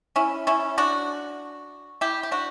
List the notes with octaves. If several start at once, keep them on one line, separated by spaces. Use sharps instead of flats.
C#4 E4
C#4 E4
D4 F#4
E4 G4
G4
D4 F#4